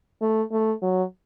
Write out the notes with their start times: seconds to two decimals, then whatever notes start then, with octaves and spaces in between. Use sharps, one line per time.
0.21 A3
0.52 A3
0.82 F#3